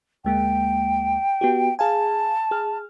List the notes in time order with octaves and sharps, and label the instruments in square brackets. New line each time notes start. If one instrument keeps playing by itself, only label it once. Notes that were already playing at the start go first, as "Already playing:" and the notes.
[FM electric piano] D2 G#3 A#3 [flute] G5
[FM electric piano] B3 F#4 G4
[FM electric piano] G#4 F5 G#5 [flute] A5
[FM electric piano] G#4 F6